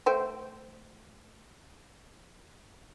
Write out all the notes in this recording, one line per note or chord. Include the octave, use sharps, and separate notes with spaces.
A3 C5 G5